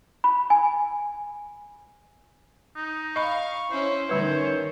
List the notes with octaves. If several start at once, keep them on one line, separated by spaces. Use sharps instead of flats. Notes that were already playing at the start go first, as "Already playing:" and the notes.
B5
G#5
D#4
D#5 F5 B5 C#6
C#4 E4 C5
D3 D#3 G3 C#4 B4 C#5